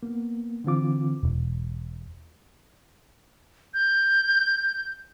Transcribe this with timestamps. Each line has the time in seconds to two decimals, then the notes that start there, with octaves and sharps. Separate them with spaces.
0.03 A#3 B3
0.64 D3 E3 C4 F4 D6
1.23 E1
3.74 G6